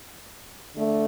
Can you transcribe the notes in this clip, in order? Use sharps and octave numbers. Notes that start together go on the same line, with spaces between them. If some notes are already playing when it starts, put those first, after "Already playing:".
D3 A3